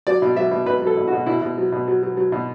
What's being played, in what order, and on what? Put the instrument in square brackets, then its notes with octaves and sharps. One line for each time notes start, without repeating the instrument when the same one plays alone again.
[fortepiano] F#3 D5
B2
F#3 E5
B2
B2 B4
F#3
A4
B2
F#4
B2
B2 E4
B2
F#3
B2
F#3
F#3
F#3
B2